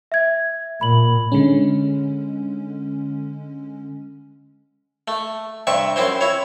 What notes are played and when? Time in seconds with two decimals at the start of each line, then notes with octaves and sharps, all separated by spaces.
0.12 E5 G#6
0.81 A#2 B5 F#7
1.32 D3 G#3 C#4
5.08 A3
5.67 G2 C3 E5 C#6
5.96 F#2 C4 E4 C5
6.21 E4 C#5